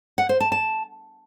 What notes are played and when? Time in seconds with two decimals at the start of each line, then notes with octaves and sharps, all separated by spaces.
0.18 F#5
0.29 C5
0.40 A5
0.52 A5